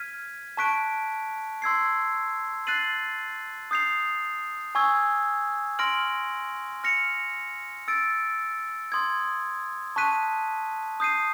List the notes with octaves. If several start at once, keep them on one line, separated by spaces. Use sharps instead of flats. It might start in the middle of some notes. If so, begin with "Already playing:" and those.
Already playing: F6 G#6 B6 D#7
A5 C#6 F#6 B6 D7
C6 E6 G#6 C7
F#6 A6 C7 D#7 F#7
D#6 G6 C7 F7
G#5 C#6 E6 G#6
C6 F6 A#6 D7 F#7
F6 A#6 C#7 F7
E6 A6 D7
C6 D#6 G#6
A5 C#6 F#6 B6 D#7
D#6 G6 C7 D#7